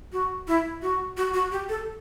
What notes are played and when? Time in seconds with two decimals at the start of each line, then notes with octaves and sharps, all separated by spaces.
0.12 F#4
0.48 E4
0.82 F#4
1.17 F#4
1.34 F#4
1.51 G4
1.69 A4